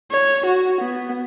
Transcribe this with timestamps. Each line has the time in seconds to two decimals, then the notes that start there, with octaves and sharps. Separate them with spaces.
0.11 C#5
0.46 F#4
0.81 B3